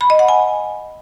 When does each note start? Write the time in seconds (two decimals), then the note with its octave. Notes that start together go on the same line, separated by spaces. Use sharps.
0.01 B5
0.10 D#5
0.19 F#5
0.28 G#5